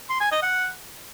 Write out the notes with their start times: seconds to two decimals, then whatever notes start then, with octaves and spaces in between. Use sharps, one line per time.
0.10 C6
0.21 G#5
0.32 D#5
0.43 F#5